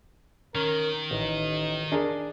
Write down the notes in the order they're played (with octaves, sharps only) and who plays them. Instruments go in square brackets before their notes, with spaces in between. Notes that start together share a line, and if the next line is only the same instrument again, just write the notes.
[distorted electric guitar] D#3 [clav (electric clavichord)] C#4 [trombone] A#4
[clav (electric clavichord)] A1 [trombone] D#4
[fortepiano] D4 G#4 A#4